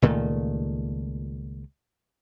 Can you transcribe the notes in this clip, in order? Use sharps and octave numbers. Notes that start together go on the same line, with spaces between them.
C#2 A#2 D#3 A3